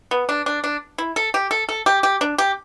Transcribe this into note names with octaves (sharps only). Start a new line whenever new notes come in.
B3
D4
D4
D4
E4
A4
G4
A4
A4
G4
G4
D4
G4